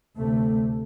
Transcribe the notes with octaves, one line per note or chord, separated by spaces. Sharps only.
D2 C3 A3